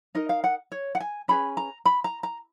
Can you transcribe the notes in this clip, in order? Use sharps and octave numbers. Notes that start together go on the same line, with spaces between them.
D#4 A#4 D#5
F5
F#5
C#5
F#5
G#5
C#4 G#4 B4 B5
A#5
B5
A#5
A#5